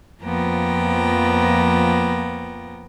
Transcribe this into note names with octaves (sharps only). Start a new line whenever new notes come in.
F2 F3 A#3 B3 G5 A#5